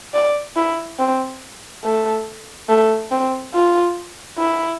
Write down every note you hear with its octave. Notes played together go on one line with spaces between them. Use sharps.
D5
E4
C4
A3
A3
C4
F4
E4